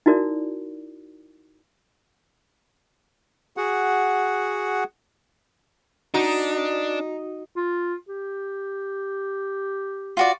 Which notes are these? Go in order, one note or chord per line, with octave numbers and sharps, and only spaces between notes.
D#4 E4 F#4 A#4 D5
F#4 G#4 F#5
D4 D#4 F#4
F4
G4
F4 F#4 D5